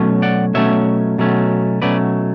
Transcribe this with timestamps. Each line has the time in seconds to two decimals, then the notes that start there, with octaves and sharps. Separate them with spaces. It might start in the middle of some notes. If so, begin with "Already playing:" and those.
Already playing: B2 F#3 A3 C#4
0.22 D5 F#5
0.54 B2 F#3 A3 C#4 C#5 E5
1.18 B2 F#3 A3 C#4
1.82 B2 F#3 A3 C#4 B4 D5